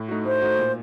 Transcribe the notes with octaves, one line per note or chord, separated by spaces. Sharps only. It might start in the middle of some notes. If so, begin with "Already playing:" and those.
Already playing: A2
A3 D#4 F#4
A2 C5
A3 D#4 F#4
A#2